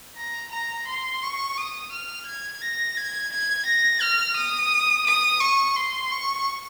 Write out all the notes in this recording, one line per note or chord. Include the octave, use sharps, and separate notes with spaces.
A#5
A#5
C6
C#6
D#6
F6
G#6
A#6
G#6
G#6
A#6
F6
D#6
D#6
C#6
C6
C#6